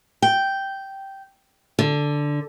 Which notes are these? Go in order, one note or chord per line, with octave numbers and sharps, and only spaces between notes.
G5
D3